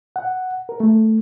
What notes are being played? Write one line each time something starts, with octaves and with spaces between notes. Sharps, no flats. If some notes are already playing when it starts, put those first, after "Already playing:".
F#5
A#4
A3